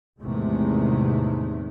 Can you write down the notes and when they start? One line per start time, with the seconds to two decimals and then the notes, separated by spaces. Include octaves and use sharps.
0.20 A1 E2 C3 D#3 G#3 A3